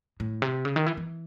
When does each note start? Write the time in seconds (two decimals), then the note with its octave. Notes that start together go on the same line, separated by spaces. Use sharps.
0.20 A2
0.42 C3
0.65 C#3
0.76 D#3
0.86 E3
0.97 E3